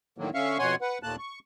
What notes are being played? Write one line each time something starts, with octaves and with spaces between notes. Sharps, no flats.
A2 D3 D#3 F#3 A#3
D3 C#4 E5 F5 C#6
F2 B2 C#5 F#5 G#5 C6
B4 F#5
D#2 A#2 A3 A#3 A5 F#6
C#6